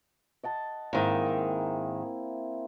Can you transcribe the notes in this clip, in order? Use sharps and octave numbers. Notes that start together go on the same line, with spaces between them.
D#5 F#5 A5
G#2 D#3 A#3 C4 E4